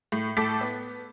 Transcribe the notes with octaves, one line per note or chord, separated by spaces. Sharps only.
A2
A2 A4 D6 B6
B3